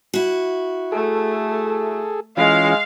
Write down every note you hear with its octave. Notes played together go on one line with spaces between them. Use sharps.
E4 F#4
A3 G#4 A4
E3 G#3 C#4 F4 F5